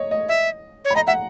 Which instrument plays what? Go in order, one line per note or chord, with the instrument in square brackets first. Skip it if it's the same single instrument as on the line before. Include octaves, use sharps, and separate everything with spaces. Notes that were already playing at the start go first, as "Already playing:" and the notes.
Already playing: [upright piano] C#5 D#5
D#5
[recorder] E5
C#5
[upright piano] B5
[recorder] D#5 [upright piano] A#5
[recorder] E5 [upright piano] F#5